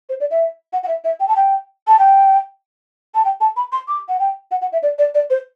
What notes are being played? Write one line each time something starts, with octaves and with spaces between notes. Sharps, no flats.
C5
D5
E5
F#5
F#5
E5
E5
G5
A5
G5
A5
G5
A5
G5
A5
B5
C6
D6
F#5
G5
F#5
F#5
E5
D5
D5
D5
C5